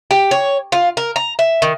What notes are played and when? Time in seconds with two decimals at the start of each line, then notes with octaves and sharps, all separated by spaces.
0.11 G4
0.31 C#5
0.72 F4
0.97 A#4
1.16 A#5
1.39 E5
1.62 D#3